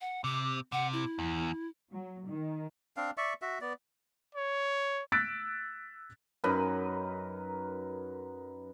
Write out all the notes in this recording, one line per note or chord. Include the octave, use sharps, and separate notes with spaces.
F#5
C3 D6
C3 F#5
E4
E2
F#3
D#3
C4 D4 F5
D5 E5 C#6
F#4 E5
B3 D5
C#5
E6 F#6 A6 B6 D7
F#2 D#4 A#4 B4